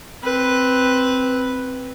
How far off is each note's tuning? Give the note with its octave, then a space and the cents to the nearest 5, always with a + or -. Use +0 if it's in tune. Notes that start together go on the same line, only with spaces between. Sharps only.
C4 +0 B4 +0